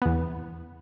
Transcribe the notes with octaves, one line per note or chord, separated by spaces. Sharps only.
E2 B3